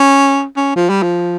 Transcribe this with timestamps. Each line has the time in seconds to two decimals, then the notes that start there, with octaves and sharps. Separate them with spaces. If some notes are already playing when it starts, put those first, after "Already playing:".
Already playing: C#4
0.56 C#4
0.76 F3
0.89 G3
1.02 F3